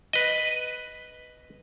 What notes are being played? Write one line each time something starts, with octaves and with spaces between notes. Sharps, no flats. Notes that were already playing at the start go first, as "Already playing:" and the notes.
B4 D#5